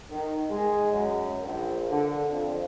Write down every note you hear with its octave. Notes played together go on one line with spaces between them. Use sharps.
D#3
G#3
F#2
A#1
D3
F2